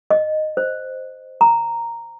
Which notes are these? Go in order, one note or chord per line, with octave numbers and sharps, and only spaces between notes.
D#5
C5
A#5